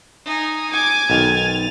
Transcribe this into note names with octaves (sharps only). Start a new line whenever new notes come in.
D#4 G#5
G#5 D6
B1 D#3 A6 F7